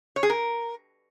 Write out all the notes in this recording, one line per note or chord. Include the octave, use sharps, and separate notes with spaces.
C#5
G#4
A#4